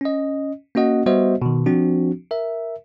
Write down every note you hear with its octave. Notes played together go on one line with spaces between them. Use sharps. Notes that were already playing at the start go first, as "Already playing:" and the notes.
C#4 D#5
A#3 C#4 F#4 D#5 F#5
G3 B3 F#4 C5 D#5 E5
B2 D#3
F3 C4 D4 F#4
A#4 E5